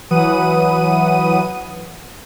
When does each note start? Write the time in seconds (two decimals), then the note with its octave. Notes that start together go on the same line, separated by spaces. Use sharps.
0.11 E3 F#3 B4 F#5 D#6 D#7